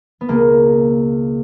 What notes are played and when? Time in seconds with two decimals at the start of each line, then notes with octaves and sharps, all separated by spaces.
0.21 B3
0.29 C#2 B2 G#3 A#3